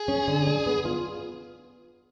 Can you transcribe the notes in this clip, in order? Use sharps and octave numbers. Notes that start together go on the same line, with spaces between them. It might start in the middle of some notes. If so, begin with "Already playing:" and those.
Already playing: G#4
C#4
D3
D4
B3
F4